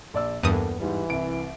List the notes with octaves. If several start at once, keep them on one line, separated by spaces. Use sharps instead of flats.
A#1 D5 E6
E2 G2 A#3 B3 A4 D#6
G#2 E3 G3
C2 D7